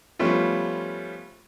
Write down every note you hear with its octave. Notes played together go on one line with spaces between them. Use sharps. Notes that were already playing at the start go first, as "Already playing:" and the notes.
F3 G3 A3 B3 C#4 F4